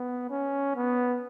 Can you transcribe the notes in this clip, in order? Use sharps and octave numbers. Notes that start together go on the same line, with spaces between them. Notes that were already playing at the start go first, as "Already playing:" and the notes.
Already playing: B3
C#4
B3